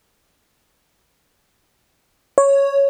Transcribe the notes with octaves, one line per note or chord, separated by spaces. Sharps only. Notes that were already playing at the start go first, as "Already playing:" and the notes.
C#5